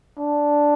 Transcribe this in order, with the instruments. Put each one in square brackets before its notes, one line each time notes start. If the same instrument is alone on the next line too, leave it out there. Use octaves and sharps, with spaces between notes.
[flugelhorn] D4